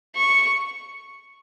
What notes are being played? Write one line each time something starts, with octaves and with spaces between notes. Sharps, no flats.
C#6